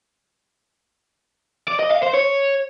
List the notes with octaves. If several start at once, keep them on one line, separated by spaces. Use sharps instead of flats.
D5
D#5
F5
C5
C#5